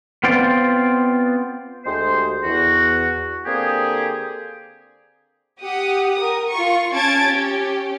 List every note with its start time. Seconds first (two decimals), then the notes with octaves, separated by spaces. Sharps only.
0.24 B3 C4 F4 C5 D5
1.85 D2 G#3 G4 C5
2.44 E2 F#4
3.46 D3 A#3 C4 G4 G#4
5.61 G4 F#5 D#6
6.15 A#4 D#6
6.50 F4 C#6
6.93 C#4 A5 G#6 A6 D7
7.25 C#4 G4